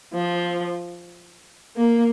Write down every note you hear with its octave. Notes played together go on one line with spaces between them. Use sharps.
F3
A#3